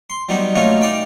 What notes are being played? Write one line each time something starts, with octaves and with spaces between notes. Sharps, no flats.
C6
F#3 G3 B3 D#4
F#3 A3 A#3 C#4 D#4 F4
D#4 D5 F5 G5